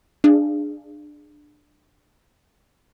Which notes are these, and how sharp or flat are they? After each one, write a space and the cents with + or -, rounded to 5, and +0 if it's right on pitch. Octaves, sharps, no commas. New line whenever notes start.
D4 +15 G#4 +0 F5 -25